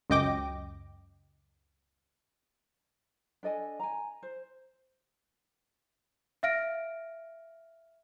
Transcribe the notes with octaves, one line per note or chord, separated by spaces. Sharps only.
C#2 F#2 D#5 G5 D6 A#6
D4 A4 D#5 G#5
G#5 A#5
C5
E5 F5 F6 A#6 D7